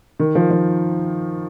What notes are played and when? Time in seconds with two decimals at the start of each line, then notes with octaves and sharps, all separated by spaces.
0.20 D#3
0.35 F3
0.51 F3